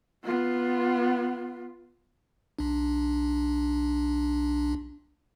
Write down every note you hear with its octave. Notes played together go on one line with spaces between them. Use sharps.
B3 F4
B1 D4